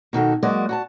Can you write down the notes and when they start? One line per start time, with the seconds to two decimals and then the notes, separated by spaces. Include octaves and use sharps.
0.13 B2 D#3 F#4 A4
0.43 F#3 G#3 A#3 F#4 D5 D#5
0.69 F#4 G#5 A5